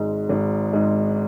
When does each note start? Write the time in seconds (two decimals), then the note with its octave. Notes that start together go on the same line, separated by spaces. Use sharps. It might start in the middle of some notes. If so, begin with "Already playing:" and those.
Already playing: G#1 G#2 G#3
0.29 G#1
0.73 G#2 G#3